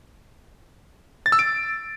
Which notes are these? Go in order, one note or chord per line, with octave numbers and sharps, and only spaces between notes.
A6
E6
D7